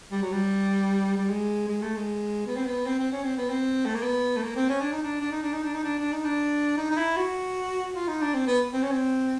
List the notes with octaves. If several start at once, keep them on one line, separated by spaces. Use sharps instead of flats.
G3
F#3
G3
G3
G#3
G#3
A3
G#3
B3
C4
B3
C4
C4
C#4
C4
B3
C4
A3
A#3
B3
A3
A#3
C4
C#4
D4
D#4
D4
D4
D#4
D4
D#4
D4
D#4
D4
D4
D#4
D4
D#4
D#4
E4
F#4
F4
D#4
D4
C4
B3
C4
C#4
C4